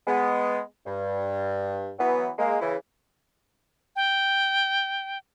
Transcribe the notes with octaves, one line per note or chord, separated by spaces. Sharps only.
G#3 B3
G2
E3 F#3 B3
G#3 A#3
C#3 E3 E4
G5